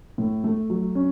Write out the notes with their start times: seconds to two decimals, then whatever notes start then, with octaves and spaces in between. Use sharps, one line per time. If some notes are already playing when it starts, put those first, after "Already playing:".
0.18 A2
0.44 A3
0.70 F#3
0.95 C#4